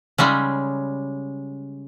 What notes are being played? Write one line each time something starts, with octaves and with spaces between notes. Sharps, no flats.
C#3 G3 G#3 C#4